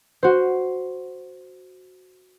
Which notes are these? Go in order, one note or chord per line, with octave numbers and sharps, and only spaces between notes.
F#4 C5